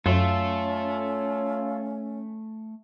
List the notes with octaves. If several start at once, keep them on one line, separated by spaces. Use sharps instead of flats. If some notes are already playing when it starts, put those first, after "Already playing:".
F#2 A3 C#4 F4 A4